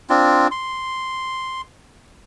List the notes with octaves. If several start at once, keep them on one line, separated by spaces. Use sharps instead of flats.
C4 D4 F4
C6